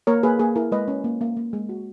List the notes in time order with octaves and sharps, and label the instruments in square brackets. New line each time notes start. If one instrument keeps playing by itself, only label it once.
[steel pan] A#3 A#4 C#5
A#3 G#4 B4
A#3 G#4
E4 A#4
G#3 B4 D#5
C#4
A#3
A#3
A#3
G#3
F#4